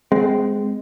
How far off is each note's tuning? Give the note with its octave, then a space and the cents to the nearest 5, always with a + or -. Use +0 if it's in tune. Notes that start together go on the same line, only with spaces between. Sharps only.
G#3 +0 C4 -20